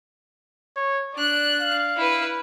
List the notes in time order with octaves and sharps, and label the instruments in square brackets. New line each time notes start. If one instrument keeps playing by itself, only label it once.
[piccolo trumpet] C#5
[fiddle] D4 F#6 [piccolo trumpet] D5
[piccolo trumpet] F5
[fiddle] E4 B4